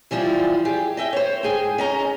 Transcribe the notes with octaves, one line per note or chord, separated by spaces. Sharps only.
E3 F3 G3 E4 F4
G4 G#4
D#5 E5 G5
C5 C#5
G#2 G#4 G5
C#4 D#5 A#5